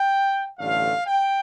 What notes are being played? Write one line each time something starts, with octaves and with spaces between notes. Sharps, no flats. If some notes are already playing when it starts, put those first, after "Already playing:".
Already playing: G5
A1 G2 D3 A3 F5
G5